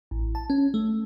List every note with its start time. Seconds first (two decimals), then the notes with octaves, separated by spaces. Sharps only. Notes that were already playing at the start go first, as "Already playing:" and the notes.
0.11 A1
0.35 A5
0.50 C#4
0.74 A3